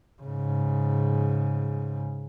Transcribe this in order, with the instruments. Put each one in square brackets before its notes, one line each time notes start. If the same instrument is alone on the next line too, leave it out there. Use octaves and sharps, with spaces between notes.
[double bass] G#2 C#3